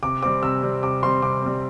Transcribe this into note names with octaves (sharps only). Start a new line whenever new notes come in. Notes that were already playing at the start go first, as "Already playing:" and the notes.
C3 D6
G3 C4 D6
C3 E6
G3 C4
C3 D6
G3 C4 C6
C3 D6
G3 C4